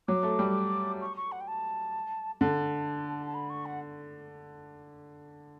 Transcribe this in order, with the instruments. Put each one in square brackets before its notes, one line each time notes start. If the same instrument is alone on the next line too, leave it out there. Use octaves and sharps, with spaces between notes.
[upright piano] F#3 [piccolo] D6
[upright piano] A3
G3
[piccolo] C#6
C#6
F#5
G5
A5
[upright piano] D3 [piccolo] A5
[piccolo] A5
B5
C#6
F#5